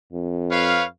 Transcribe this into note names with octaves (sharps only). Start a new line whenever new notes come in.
F2
B4 C#5 F5